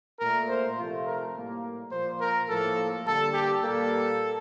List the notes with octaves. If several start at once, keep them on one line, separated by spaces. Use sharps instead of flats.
A#2 A3 A#4
C5
C3 F3 A3 F4
A#4
A2 G3 A#3
A#2 F3 A#3 C5
A#4
A2 F3 A#3 A4
D3 G3 A#3 A4
G4
A#2 G3 A#3 A4